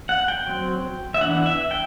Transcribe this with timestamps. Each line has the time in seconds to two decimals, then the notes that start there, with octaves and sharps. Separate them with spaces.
0.09 F#5
0.28 G5
0.47 F#3 C4
1.14 E5
1.21 E3 B3 D4 F#5
1.46 E5
1.71 G5